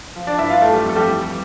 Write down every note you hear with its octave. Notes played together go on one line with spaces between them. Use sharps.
F3
D4 D5
G2 E4 E5
F4 F5
E3 A3 A4
G3 G4
F2 A4
G3 G4
E3